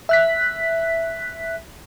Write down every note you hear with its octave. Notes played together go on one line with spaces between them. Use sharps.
E5 F#6 B6